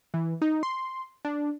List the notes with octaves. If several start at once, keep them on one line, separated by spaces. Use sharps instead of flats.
E3
D#4
C6
D4